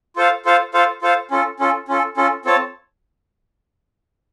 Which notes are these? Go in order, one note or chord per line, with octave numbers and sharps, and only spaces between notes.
F4 A4 C5 F5
F4 A4 C5 F5
F4 A4 C5 F5
F4 A4 C5 F5
C#4 F4 A4
C#4 F4 A4
C#4 F4 A4
C#4 F4 A4
C4 F4 A4 C#5 A5